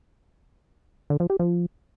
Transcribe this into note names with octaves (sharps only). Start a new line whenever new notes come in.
D3
F3
G4
F3